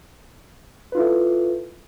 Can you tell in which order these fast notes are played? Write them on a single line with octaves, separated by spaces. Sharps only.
B4 F4 E4 A4